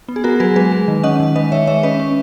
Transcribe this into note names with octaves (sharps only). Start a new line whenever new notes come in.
B3
G#4
B3 F#4 A#4
F#3 G#4 B4
G#3 G#4 B4
G#3
D#3
C#4 D#5 F#5
D#3
G#3 B4 D#5
D#3 C#5 E5
G#3 C#5 E5
C#4 B4 D#5
C#4